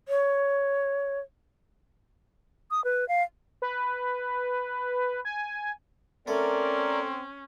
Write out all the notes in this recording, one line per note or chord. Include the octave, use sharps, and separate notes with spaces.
C#5
D#6
B4
F5
B4
G#5
A3 C4 C#4 A#4 D5